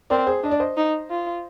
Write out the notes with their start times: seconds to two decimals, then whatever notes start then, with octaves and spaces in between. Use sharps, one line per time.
0.10 C4 A#4 D5
0.27 G#4 C5
0.44 D4 D#5
0.51 D5
0.60 C5 D#5
0.77 D#4
1.10 F4